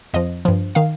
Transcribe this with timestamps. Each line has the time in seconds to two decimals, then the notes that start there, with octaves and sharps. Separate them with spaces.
0.14 F2 F3 D#5
0.45 G2 F3
0.75 D#3 F5